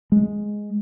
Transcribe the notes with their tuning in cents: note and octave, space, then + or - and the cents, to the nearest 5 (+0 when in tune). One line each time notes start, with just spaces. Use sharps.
G#3 +0